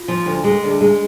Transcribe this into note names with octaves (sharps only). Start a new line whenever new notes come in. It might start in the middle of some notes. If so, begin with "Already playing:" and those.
Already playing: F4
F3
D2
G#3 G#4
D2
G#4
G#3